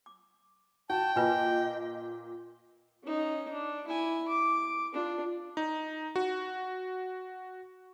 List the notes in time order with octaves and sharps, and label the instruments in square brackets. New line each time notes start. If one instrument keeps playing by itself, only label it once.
[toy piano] D6
[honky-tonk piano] F#4 [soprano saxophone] G5 [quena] A5
[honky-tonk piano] A#2 [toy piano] F4 B4 G#5 [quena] D#5
[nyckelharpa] C#4 D#4
D4
E4 G#5
D6
D4 F4
[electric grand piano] D#4
F#4